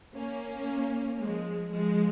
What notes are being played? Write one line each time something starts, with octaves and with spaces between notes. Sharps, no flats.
A#3 C#4
F3 G#3
F3 G#3